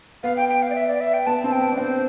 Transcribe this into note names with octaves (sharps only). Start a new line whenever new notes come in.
B3 F5
G5
G5
F5
D5
E5
D5
E5
G5
B3 A5
C4
G5
B3
D4
C4 C5